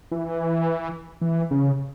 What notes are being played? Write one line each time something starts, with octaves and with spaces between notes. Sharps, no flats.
E3
E3
C#3